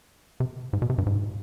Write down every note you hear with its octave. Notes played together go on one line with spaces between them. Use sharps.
C3
G#2
B2
C3
G2
G#2